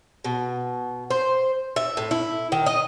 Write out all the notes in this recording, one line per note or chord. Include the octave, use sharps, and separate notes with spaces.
B2
C5
E5
A2
E4
D#3
D#5